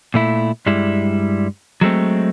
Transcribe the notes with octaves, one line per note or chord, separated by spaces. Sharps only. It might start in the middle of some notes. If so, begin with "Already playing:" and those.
A#2 A3 E4
G2 G3 G#3 E4
F#3 G#3 A3 C4